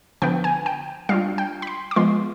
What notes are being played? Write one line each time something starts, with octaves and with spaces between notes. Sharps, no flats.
D3 F3 B3 G5
G#5
G5
G3 D4 F4 F5
G5
B5
C6
D6
F3 G#3 B3 F4 C6